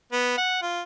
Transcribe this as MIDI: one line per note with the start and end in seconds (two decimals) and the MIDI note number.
0.12 0.33 59
0.37 0.60 78
0.62 0.82 65